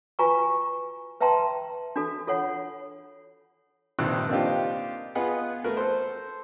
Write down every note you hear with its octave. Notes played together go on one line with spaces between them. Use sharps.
F4 F#4 B4 G#5 A#5 C#6
B4 E5 G5 A5 A#5 C6
D4 F#4 A4
F4 A4 C#5 F#5
A#1 G2 C3 D#3 E6 F#6
A#3 C4 D4 D#4 F4 G4
B3 F4 G#4 B4 D#5 F#5
A3 F#4 A#4 B4
A4 C5